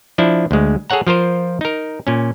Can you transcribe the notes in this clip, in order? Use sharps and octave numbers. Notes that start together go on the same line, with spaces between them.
F3 D4 E4
D2 G#3
G#4 A4 C#5 F#5 A#5
F3 F4 A#4 C5
D#4 A#4
A#2 C#4